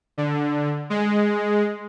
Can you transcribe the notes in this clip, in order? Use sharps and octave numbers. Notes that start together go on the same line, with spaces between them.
D3
G#3